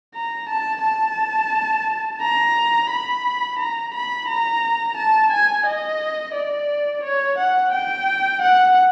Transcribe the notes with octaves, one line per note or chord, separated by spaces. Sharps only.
A#5
A5
A5
A#5
B5
A#5
B5
A#5
A5
G#5
D#5
D5
C#5
F#5
G5
F#5